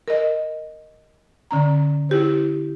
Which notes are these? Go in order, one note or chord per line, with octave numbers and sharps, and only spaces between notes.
A#4 D#5
D3 C#4 A#5
E4 G4 C5